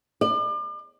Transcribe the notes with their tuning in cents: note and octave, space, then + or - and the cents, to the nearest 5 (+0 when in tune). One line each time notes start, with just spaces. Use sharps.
D5 +40